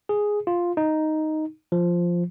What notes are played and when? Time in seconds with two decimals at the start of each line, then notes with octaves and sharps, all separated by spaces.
0.09 G#4
0.47 F4
0.77 D#4
1.72 F3